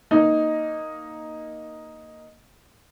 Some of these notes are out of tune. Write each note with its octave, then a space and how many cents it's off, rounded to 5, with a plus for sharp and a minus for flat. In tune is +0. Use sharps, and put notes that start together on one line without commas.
A#3 +0 D#4 +0